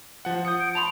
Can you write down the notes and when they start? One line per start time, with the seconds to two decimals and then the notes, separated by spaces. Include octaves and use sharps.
0.25 F3 F#5
0.45 D#6 G6 C#7
0.60 D7
0.75 A5 B5 C6 F7